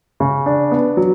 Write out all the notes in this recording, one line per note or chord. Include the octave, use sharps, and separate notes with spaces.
C#3
D4
B3
F#3